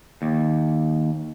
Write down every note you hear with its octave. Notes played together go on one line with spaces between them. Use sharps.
D#2